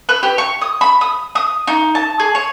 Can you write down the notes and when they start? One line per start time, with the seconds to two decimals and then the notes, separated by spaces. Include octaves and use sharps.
0.09 B4
0.23 G4
0.38 C#6
0.61 D#6
0.81 B5
1.01 D#6
1.35 D#6
1.67 D#4
1.95 A5
2.20 G#4
2.35 C#5